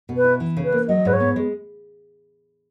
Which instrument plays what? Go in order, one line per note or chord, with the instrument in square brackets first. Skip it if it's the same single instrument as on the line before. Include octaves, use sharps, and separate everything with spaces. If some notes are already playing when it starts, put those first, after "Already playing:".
[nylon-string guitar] B2
[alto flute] B4
[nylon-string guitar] E4
E3
C#3
[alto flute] B4
[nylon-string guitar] A#3
[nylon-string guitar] F#3 [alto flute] D#5
[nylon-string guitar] G#2 [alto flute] B4
[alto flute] C#5
[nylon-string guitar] B3
G#3